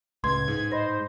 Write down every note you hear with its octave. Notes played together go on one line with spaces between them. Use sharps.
C#2 A2 B4 C6 G#6
G#2
C5 D#5 B5 A#6